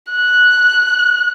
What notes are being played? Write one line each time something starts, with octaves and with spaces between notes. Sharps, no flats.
F#6